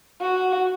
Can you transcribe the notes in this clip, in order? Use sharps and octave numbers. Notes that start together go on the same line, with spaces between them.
F#4